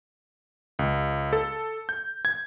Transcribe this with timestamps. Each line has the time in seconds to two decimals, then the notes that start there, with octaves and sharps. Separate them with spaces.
0.79 C#2
1.33 A4
1.89 G6
2.25 G#6